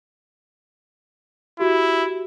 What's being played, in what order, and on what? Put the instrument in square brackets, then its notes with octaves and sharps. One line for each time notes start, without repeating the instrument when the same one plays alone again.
[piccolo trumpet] E4 [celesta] F#4 G4